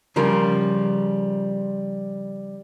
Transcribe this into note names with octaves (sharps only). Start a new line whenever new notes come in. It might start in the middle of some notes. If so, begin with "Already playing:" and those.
C#3 F3 G3 A#4